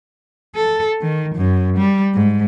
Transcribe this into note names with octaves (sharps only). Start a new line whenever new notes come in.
A4
D#3
F#2
G3
G#2